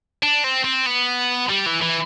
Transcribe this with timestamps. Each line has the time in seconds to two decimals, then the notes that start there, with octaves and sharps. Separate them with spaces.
0.23 D4
0.44 C4
0.65 C4
0.86 B3
1.49 G3
1.66 E3
1.81 E3